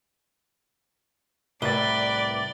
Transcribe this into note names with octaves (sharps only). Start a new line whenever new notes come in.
C2 A2 B4 D5 A6 G7